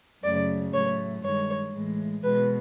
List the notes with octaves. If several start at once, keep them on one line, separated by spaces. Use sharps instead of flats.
F#2 C#3 F#3 A3 D5
A2 F#3 A3 C#5
G2 D#3 G#3 C#5
A2 E3 G#3
B2 G#3 B4